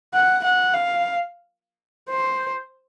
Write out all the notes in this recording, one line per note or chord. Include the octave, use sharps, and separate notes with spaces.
F#5
F#5
F5
C5